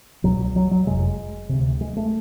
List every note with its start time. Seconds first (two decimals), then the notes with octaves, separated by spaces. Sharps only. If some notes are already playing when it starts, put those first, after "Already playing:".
0.24 C2 B2 F#3
0.56 F#3
0.71 F#3
0.87 F#1 F2 C3 G#3
1.49 D2 C3
1.81 G#3
1.97 A3